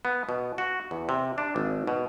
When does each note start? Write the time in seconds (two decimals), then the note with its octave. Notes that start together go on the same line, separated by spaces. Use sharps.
0.05 B3
0.29 B2
0.58 F#4
0.91 E2
1.09 C3
1.38 D4
1.56 G#1
1.87 B2